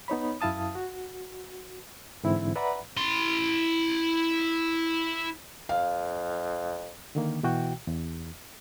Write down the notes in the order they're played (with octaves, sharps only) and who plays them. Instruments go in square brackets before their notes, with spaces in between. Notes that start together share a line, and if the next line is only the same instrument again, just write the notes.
[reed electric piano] B3 D#4 C#5 B5
F#2 E4 F5 A5 D#6
F#4
G#2 D3 E3 C4 E4
B4 D5 E5 F#5 A#5 B5
[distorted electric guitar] E4 C6
[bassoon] F2 [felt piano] F5
[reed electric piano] D3 D#3 A#3
B2 E3 F#4 G5
E2